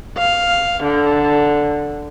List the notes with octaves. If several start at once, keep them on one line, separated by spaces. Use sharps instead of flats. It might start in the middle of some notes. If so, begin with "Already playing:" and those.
F5
D3